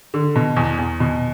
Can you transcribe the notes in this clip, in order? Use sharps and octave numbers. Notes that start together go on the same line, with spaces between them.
D3
B2
E2
E2
B2